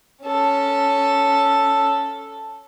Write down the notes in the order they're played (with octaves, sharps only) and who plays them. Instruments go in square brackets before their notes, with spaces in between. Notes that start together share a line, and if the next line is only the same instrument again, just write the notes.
[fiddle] C#4 A4